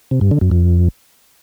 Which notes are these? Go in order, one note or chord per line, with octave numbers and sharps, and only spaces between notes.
C3
G2
D3
F#2
F2